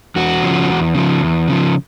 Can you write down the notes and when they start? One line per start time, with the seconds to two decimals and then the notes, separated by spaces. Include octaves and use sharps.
0.16 E2 F#4
0.42 C#3 F3
0.69 E2
0.94 C#3 F3
1.21 E2
1.48 C#3 F3